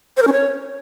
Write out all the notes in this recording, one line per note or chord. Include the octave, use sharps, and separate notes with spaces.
C5
A#4
C#4
C#5